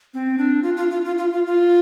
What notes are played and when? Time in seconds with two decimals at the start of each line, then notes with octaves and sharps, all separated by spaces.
0.14 C4
0.38 D4
0.63 F4
0.77 F4
0.91 F4
1.05 F4
1.18 F4
1.33 F4
1.47 F4